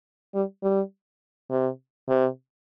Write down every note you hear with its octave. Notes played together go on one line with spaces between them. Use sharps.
G3
G3
C3
C3